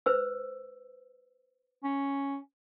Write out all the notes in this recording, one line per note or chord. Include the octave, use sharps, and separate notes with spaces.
B4 C5 E6
C#4